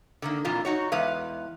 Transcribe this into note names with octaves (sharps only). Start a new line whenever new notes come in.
D3 D#3 A#3
F2 A#2 E3 F4 A#4
D#4 F#4 C#5
E2 G#3 B4 F5